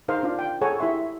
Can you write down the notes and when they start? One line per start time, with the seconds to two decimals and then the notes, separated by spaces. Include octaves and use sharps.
0.08 D#4 G#4 A#4 C5 F5
0.23 D4 F4 D5 F5
0.39 G5
0.61 G#4 A4 C#5 F#5 G#5 A#5
0.78 E4 G4 G#4 E5 C6 C#6